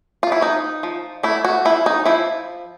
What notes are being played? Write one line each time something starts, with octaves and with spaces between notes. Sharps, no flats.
F4
E4
F3 D#4
F3
A3 E4
F#4
F3 E4
D#4
F3 E4